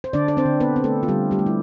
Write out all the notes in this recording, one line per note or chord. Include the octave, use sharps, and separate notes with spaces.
C5
D3 D4 D5
D5
C4 C5
D3
B3 B4
C4
A3 A4
F4
D3 G3 G4
G3 G4
A3
E4